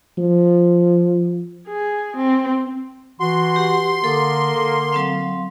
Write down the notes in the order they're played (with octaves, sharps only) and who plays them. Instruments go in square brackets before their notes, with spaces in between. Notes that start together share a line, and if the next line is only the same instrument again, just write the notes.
[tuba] F3
[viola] G#4
C4
[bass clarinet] E3 [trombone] F#4 [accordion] C6
[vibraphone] G4 F#5
[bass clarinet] D3 [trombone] A#3 [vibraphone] A4 D6 D#6
[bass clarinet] D3
[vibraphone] F#3 C4 F5